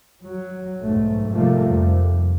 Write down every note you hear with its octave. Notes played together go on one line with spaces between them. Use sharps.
F#3
B1 G#2 A3
G#2 C3 F3 G3 A3 A#3
F2